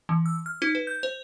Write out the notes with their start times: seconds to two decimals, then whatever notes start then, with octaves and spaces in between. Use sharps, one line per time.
0.09 E3
0.26 E6
0.46 F6
0.62 D#4
0.75 B4
0.87 G6
1.03 C5